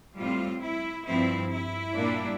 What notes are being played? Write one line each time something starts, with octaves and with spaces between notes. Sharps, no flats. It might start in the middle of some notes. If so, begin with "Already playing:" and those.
A2 G3 C4 F4
E4
G2 F3 C4 E4
E4
A#2 G3 A#3 D4